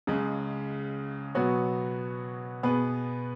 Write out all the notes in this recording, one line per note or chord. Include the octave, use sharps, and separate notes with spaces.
C#2 C#3 G#3
B2 F#3 B3 F#4 C#5
B2 B3 G#4 B4